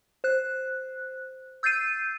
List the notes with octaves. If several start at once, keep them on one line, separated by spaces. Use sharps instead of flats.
C5 F#6
E6 G6 A6 C7 D#7